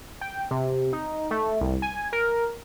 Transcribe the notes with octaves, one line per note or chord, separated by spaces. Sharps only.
G5
C3
D#4
A3
C2
G#5
A#4